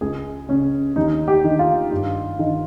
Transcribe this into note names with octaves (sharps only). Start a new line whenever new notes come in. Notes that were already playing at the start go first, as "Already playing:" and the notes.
C#2 G#4
C#3 C#4
D#2 D#4
G4
D#3
F4
G2
D#3